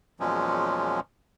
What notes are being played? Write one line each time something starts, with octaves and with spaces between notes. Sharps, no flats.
E2 A#2 F3 F#3 G#3 C#4